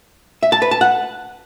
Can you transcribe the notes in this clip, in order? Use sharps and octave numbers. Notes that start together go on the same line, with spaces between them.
E5
A5
B4
A5
F#5